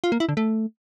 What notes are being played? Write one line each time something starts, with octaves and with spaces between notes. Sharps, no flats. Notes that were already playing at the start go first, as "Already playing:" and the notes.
F4
A#3
E4
D3
A3